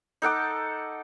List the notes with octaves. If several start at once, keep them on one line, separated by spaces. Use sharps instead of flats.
D#4 A4 F#5 D6